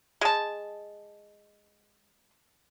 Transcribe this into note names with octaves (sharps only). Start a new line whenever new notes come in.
G#3 A5